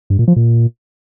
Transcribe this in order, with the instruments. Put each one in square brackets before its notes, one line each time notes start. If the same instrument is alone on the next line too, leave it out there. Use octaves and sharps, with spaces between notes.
[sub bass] G2
A#2
F3
A#2